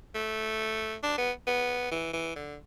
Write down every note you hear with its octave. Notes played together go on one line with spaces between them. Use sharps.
A3
D4
B3
B3
E3
E3
D3